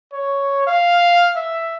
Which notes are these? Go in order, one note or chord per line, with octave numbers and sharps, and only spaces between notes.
C#5
F5
E5